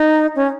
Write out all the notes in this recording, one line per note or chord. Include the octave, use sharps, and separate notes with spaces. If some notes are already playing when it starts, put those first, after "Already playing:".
Already playing: D#4
C#4